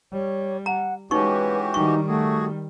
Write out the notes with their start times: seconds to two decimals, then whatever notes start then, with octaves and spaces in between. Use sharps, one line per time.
0.13 G3 C#5
0.66 F#5 A#5
1.11 E3 G#3 C#4 D#4 F#4 G4 B4 C#6
1.74 D#3 G3 D#4 C#6
2.07 A3 F#4 G#4